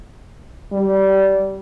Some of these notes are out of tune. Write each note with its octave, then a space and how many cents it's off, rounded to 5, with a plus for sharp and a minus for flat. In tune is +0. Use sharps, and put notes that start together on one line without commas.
G3 -20